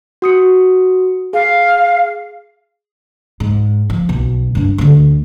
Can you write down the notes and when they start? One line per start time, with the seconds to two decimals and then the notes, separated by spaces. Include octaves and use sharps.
0.22 F#4 D#6 C#7
1.33 G#4 F5
3.40 G#2
3.90 F3
4.09 B1 B2
4.55 G2 D4
4.78 D2 D3